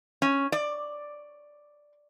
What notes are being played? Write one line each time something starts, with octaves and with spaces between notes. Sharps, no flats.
C#4
D5